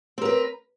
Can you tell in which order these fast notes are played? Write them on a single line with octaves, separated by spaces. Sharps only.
C4 A#4 B4